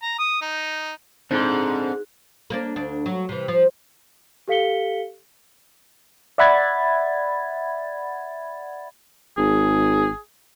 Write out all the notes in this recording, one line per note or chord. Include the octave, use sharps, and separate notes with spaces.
A#5
D#6
D#4
G#2 C4 D4 A4
A#3 C4 D4
D2 D4
F#3
C3 E3
F3
G4 A4 F5 B6 C#7 G7
D5 E5 F#5 B5 G#6 A6
G#1 G#4